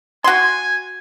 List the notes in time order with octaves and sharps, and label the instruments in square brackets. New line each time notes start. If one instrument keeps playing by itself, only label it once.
[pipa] F#4 C6 [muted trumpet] G#5